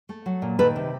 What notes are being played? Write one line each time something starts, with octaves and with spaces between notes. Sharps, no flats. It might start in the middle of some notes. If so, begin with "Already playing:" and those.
A3
F#3
A#2
D#3 A4 B4
C3